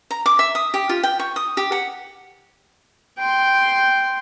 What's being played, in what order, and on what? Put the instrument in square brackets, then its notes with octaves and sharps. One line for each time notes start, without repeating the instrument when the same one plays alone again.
[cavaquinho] A#5
D6
E5
D#6
G4
F4
G5
C#6
D#6
G4
F#5
[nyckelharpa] G5 C6